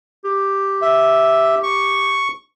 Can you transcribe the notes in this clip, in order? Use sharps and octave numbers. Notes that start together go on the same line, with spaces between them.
G4
E5
C#6